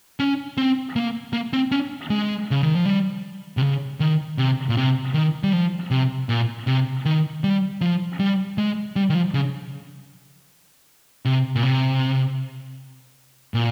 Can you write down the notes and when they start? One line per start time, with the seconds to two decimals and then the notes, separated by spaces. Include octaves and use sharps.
0.20 C#4
0.57 C4
0.96 A#3
1.33 A#3
1.53 C4
1.72 C#4
2.10 G#3
2.51 C#3
2.63 D#3
2.75 F3
2.85 G3
3.57 C3
3.62 C#3
4.00 D#3
4.38 C3
4.69 A#2
4.77 C3
5.14 D#3
5.44 G3
5.53 F3
5.91 C3
6.29 A#2
6.67 C3
7.05 D#3
7.44 G3
7.81 F3
8.20 G3
8.58 G#3
8.96 G3
9.10 D#3
9.15 F3
9.34 C#3
11.25 C3
11.56 A#2
11.63 C3
13.54 A#2